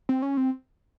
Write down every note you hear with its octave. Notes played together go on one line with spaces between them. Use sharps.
C4
C#4
C4